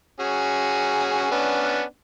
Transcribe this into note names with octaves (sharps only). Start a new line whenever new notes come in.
C#4 F#4 G#4
B3 C#4 D4